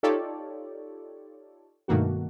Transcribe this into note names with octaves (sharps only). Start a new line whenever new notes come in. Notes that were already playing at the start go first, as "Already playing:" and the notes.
D#4 F4 G4 A4 C#5 D5
G2 B2 D#3 A3 A#3 F#4